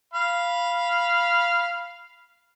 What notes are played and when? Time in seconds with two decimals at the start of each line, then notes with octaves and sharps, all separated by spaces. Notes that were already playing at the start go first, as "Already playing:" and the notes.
0.14 F5 B5